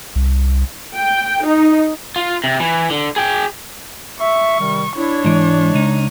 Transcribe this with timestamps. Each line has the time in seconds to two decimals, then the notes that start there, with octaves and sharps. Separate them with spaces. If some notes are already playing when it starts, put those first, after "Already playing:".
0.16 C2
0.95 G5
1.45 D#4
2.16 F4
2.44 C3
2.60 E3
2.90 D3
3.16 G#4 G5
4.20 E5 C#6
4.59 C3 D#3 G3
4.96 D4 E4 C#5
5.25 G#2 E3 G#3
5.74 C#2 D#4